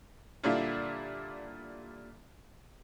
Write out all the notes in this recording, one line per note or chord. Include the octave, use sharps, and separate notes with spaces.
A#2 D3 G3 D4 E4 F4